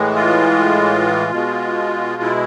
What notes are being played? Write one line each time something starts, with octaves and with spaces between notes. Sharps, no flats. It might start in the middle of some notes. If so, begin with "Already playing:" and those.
Already playing: A2 E3 G#3
F4
B2 G#3
E4